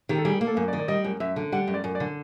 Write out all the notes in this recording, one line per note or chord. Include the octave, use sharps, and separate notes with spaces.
D#3 G4
A4
G3 G#4
A#3
A4
F#2
D5
D#3
D5
G3 D#5
F#2
F#2 E5
D3
G3 F#5
F#2
D5
F#2
D5
D3